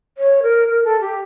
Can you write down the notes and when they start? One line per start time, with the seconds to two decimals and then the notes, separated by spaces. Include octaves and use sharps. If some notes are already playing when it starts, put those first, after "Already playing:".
0.18 C#5
0.43 A#4
0.68 A#4
0.84 A4
1.01 G4